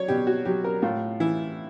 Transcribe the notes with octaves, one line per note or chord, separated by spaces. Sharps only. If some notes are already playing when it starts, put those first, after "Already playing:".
Already playing: F#3 C#5 D5
B2 G4
F#4
F#3 G4
A#4
A2 F4
E3 E4